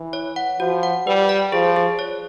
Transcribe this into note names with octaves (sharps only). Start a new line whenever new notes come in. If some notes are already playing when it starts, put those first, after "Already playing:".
Already playing: E3
C#5
F#5
F3 F#4
F#5
G3 B4
D5
F3 G#4
G#4
C#5